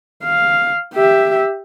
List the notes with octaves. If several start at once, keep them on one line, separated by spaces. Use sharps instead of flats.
F5
G4 E5